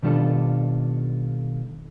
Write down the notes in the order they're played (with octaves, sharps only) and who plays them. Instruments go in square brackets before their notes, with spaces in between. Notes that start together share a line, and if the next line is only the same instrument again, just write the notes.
[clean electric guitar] B2 D#3 G3 D4 F4 A4